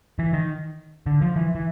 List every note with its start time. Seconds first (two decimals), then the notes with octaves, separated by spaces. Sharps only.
0.19 E3
0.33 D#3
1.06 D3
1.21 F3
1.36 E3
1.55 E3